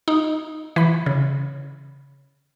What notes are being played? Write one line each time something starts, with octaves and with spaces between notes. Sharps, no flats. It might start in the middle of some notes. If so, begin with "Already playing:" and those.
D#4
E3 B5
C#3